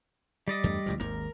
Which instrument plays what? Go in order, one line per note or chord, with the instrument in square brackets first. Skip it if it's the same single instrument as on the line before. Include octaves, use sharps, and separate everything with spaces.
[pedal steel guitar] G3 D5 D#5
[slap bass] E2 G2 A3
D2 A2 F3
[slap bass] G#1 D#2 G#2 [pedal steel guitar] A#4